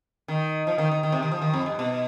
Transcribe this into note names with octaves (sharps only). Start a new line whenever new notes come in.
D#3
F3
D#3
D#3
D#3
C3
D#3
F3
D#3
F2
G2
B2